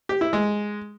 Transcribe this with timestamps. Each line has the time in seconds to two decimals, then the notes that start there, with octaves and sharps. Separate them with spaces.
0.09 G4
0.21 E4
0.33 G#3